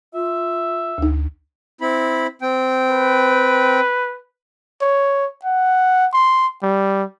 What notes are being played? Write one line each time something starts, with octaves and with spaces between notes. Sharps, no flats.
F4 E5
D2 D#4
C4 E4 B5
C4 G5
B4
C#5
F#5
C6
G3